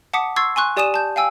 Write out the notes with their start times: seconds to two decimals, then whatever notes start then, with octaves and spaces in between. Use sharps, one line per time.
0.13 F#5 A5 D6 D#6 B6 C#7
0.36 C6 C#6 E6 G#6 A6 C7
0.56 G#5 C6 C#6 F#6
0.77 G4 D5 G#5 D#6 D#7 E7
0.94 A5 G6
1.16 F5 G5 G#5 E6